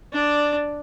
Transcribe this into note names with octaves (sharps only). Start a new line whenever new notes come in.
D4 D5